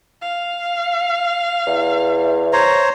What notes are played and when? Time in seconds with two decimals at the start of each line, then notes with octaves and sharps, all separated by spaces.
0.22 F5
1.67 E2
2.53 C5 C#5 A#5